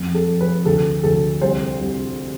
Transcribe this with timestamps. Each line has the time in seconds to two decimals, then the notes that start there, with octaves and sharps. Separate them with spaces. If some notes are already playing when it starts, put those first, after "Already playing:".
Already playing: F2
0.15 A4
0.28 F2
0.41 B4
0.65 D2 A4
1.03 D2 A4
1.41 C2 C5
1.81 C2